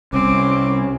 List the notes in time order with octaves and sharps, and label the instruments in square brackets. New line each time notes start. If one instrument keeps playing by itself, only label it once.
[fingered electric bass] C2 [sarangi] C4 [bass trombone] C#4 [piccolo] D6